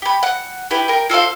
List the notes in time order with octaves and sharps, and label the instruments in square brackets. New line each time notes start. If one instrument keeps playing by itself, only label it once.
[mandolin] G4 B5
F#5
E4 G4 B4
A#4 G5
F4 A4 C5 F5